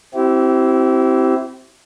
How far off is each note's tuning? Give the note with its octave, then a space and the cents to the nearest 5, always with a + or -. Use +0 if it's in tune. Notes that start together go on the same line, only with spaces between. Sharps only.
C4 +0 E4 +0 G4 -35